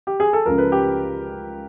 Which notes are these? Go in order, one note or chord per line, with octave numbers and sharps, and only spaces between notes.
G4
G#4
A4
C#2 C#3 F3 A#4
B4
G4